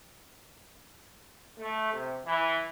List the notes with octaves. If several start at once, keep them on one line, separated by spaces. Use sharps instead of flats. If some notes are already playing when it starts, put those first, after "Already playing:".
A3
C3
E3